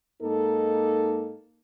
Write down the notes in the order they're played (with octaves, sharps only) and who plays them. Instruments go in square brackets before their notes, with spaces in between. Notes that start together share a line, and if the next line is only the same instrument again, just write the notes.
[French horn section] G#2 A#3 D#4 A4